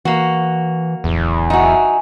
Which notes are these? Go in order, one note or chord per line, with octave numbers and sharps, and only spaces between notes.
E3 A#3 F#4
D1 E2
D#4 F#4 E5 G#5